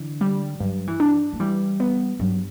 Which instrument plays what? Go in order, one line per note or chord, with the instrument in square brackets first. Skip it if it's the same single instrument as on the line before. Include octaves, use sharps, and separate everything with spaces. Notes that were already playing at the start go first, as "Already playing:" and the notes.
Already playing: [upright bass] D3 [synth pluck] E3
[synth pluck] G3
[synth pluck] G2 [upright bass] F#3
[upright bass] E3
[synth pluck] D4
[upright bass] A#3
[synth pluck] E3 [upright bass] G3
[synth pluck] B3
[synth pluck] G2 [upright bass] F#3